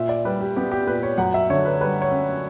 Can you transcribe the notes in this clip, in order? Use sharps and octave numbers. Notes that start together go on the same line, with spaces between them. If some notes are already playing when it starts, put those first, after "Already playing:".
Already playing: A#2 E5
D5
G3 B4
G4
B3 G4
G4
A#2 B4
C#5
F#2 F#5
E5
D3 C#5
B4
G3 B4
C#5
C#4